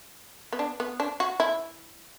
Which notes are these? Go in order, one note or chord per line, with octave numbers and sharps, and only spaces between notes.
B3
D4
B3
D4
F#4
E4